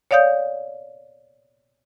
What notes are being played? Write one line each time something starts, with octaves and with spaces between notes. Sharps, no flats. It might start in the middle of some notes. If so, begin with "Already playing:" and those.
C#5 D5 F5 D#6 G6